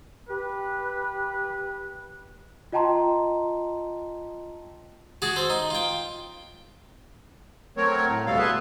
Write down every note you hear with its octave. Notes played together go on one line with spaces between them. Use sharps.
G4 B4
F4 D#5 G5 A5 A#5 C6
F#4 G#4 A5
A4 C5
D#4
F4 G5
F#3 A3 C4 A#4 C#5
A2
D2 B2 G3 B3 A4 F5
G#4 B4 E5 A5 C6